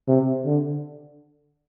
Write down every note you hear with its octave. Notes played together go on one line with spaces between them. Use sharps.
C3
D3